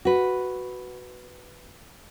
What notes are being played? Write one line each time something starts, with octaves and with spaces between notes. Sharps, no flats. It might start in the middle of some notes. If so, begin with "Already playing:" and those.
F#4 B4